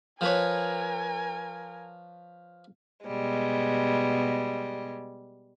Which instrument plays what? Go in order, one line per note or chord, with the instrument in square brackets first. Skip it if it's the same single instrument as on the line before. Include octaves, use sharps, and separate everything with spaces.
[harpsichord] F3 B4 C#5 [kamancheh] A#4 G#5
[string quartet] B2 G3 G#3